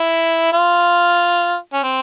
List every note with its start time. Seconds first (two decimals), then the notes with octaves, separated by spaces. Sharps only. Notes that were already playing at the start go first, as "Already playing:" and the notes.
Already playing: E4
0.53 F4
1.73 C#4
1.83 C4